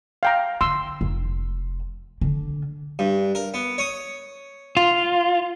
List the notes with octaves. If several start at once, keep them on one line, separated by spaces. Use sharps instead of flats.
F5 G5 A#5
D3 C6 E6
F1
D3
G2
A#4
B3
C#5 D#6
F4